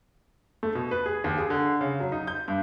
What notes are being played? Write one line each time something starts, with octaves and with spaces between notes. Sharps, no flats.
A3
B2
B4
G#4
D#2
G#4
D3
C#3
F#3
D#4
G6
G2